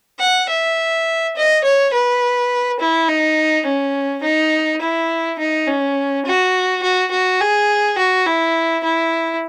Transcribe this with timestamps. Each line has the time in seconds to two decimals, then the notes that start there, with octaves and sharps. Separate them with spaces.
0.19 F#5
0.49 E5
1.36 D#5
1.64 C#5
1.93 B4
2.79 E4
3.08 D#4
3.65 C#4
4.23 D#4
4.81 E4
5.39 D#4
5.67 C#4
6.25 F#4
6.83 F#4
7.11 F#4
7.40 G#4
7.98 F#4
8.26 E4
8.83 E4